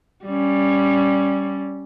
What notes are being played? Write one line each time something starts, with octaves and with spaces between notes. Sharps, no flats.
G3 C#4